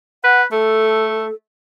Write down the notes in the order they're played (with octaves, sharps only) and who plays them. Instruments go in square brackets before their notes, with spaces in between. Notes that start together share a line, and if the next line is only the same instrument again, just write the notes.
[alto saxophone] B4 [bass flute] F#5
[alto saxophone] A3 [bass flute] A4